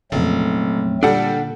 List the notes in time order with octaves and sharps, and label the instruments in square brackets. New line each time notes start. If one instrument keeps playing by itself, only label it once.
[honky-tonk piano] F1 [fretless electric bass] F2 A#2 C#3 [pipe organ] F#3 A3 C4
[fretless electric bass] A#2 [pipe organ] D3 [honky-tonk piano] G3 A4 [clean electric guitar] D4 F#5